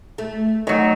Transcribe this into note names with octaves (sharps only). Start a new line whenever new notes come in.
A3
D#3 F#3 C#5